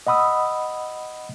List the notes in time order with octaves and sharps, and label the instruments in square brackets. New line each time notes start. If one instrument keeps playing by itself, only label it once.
[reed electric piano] D#5 F#5 B5 D#6 E6